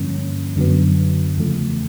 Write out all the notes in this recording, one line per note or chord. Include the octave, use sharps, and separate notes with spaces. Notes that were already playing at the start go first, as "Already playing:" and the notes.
Already playing: G2 D3 F3 A#3 C#4
F#2 D3 F#3 B3
E2 C#3 F3 A3